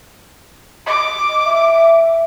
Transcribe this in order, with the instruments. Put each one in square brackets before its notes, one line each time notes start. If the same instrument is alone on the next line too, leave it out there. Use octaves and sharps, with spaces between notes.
[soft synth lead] D#5 [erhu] D6
[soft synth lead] E5